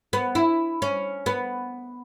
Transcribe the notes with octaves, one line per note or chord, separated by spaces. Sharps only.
B3
E4
C#4
B3